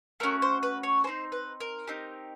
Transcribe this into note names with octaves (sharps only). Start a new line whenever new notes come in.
A3 C#4 F#4 A#4
C5
B4
C#5
C4 D#4 G#4 C5
B4
A#4
C4 D#4 G4